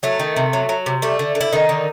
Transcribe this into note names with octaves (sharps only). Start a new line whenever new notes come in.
F#3 A3
D#3
C3
F#3
F#3
C3
G3 A3
D3
D3
E4
D3 D#3 D#4
D3